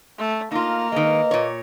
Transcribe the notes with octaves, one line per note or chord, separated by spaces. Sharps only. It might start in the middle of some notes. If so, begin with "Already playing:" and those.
A3
A#3 D#4 F4
D#3 G#3 B4 D#5
A#2 C#5